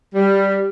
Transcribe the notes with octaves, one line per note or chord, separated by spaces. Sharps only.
G3